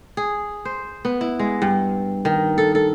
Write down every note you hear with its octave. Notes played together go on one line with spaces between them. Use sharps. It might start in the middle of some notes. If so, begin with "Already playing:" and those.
G#4
C5
B3
E4
G#3
G2
D#3
A4
A4